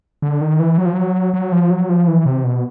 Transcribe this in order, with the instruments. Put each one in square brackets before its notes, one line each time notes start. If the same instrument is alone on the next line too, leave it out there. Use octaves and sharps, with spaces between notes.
[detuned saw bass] D3
D#3
E3
F#3
F3
F#3
F#3
F3
F#3
F3
E3
C3
B2